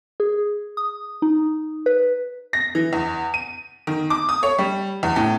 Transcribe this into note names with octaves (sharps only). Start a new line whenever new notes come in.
G#4
D#6
D#4
B4
A#6
E3
E2
D#7
D#3
D6
D#6
C#5
G3
E2
A2